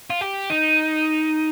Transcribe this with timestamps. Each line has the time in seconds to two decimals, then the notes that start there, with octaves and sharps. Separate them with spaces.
0.10 F4
0.21 G4
0.50 D#4